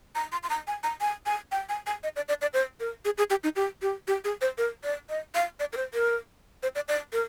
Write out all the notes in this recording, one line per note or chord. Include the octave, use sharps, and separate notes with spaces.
A#5
C6
C6
A#5
G#5
A#5
G#5
G#5
G5
G#5
G#5
D#5
D5
D5
D5
C5
A#4
G#4
G#4
G4
D#4
G4
G4
G4
G#4
C5
A#4
D5
D#5
F5
D5
A#4
C5
A#4
C5
D5
D5
A#4